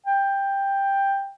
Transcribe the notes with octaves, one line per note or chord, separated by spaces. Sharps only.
G5